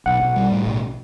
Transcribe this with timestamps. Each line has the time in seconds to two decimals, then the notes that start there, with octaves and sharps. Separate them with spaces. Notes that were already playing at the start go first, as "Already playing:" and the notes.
0.06 B1 F#5
0.21 B1
0.36 G3
0.52 A2
0.66 B1